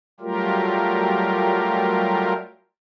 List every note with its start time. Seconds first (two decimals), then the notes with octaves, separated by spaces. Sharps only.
0.20 F#3 G3 A3 F4 G4 A#4